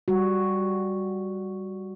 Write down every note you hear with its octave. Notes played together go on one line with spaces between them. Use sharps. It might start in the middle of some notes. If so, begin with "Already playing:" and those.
G3 F#4